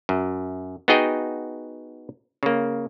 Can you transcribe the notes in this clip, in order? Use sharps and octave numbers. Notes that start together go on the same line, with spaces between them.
F#2
B3 D#4 F#4 G#4 D#5 G5
C#3 A#3